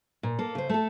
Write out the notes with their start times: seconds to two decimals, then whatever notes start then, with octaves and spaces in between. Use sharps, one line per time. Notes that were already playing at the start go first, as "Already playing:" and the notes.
0.23 A#2
0.39 A#3 A4
0.55 C#3 C5
0.70 A3 A4